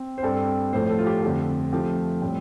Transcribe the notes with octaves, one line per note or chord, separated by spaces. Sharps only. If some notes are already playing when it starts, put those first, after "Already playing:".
Already playing: C4
C5
G2 G3 C4 A4
A2 F3 A3 C5
A4
F4
G4
F2 D3 A3 G4
C3 F3 A3 G4
A2 G3 C4